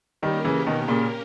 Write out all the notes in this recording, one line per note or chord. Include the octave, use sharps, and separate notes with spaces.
D#3 G3 A#3 C#4 G4 A#4
C#3 E3
B2 D#3
A#2 C#3